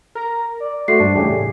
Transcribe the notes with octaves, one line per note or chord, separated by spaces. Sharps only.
A#4 A#5
D5
A3 F#4 C5 C7
G2 D4
E2 A2 C#3 G4 G#4